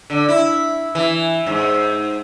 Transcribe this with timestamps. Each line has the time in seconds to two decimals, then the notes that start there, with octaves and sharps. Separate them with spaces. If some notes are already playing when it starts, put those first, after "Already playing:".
0.10 D3
0.29 E4
0.95 E3
1.46 G#2